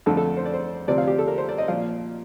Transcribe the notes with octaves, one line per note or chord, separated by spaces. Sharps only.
F2 D3 A3 D4 A4
A4
C5
D5
C5
D2 C3 F3 C4 D5
F5
G4
A4
A#4
C5
D5
D#5
A#2 F3 F5